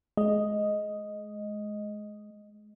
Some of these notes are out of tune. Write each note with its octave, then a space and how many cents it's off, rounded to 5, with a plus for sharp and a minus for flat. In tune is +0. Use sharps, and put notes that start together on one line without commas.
G#3 +25 D#5 +0